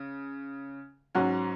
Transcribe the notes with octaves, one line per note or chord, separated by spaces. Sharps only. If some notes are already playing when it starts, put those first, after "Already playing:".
Already playing: C#3
G#2 F#3 C#4 F#4